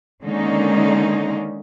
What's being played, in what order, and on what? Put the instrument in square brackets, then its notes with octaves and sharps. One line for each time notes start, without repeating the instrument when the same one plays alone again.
[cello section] D3 D#3 G#3 A#3 C#4 D#4